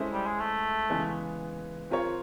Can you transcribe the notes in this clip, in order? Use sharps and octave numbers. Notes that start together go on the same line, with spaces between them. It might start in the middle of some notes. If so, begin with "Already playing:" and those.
Already playing: G#3 C#4 E4 A4 C5
G3
G#3
A3
C#3 E3 G#3 B3
C4 F4 A#4 C#5